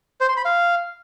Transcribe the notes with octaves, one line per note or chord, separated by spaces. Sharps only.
C5
C6
B5
F5